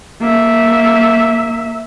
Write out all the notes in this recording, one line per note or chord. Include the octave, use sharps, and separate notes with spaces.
A#3 E5